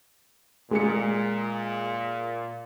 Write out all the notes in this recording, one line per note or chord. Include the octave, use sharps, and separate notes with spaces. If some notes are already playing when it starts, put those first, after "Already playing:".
A#2 G#3 G#4 C#7